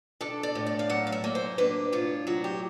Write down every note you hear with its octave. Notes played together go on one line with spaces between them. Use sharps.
D4 A4
D5
A2
D5
F5
F#3 F#5
F5
E5
A#3
C5
D4 B4
A2 F4
F#3 F#4
G4